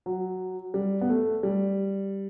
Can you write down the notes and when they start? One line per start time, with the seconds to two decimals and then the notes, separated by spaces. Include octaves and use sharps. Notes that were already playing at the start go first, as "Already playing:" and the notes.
0.06 F#3
0.74 G3
1.01 B3
1.09 A3
1.43 G3